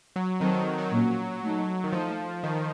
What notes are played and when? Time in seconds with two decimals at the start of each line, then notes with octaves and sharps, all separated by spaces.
0.16 F#3
0.40 D#3 F#3 C4 D#4 A4 D#5
0.53 D#3
0.78 F#3
0.91 A#2 F3 A#3 C#4
1.42 A3 D#4 A4
1.84 D#3
1.92 F3 A3 D#4 A4 D#5
2.43 D#3